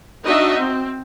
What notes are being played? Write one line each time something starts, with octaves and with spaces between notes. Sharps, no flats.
D4 D#4 F#4 D#5 E5
C4